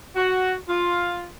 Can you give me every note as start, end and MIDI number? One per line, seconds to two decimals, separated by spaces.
0.16 0.54 66
0.69 1.27 65